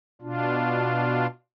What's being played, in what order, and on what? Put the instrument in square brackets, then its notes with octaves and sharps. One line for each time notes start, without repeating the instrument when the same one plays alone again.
[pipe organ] B2 D4 F4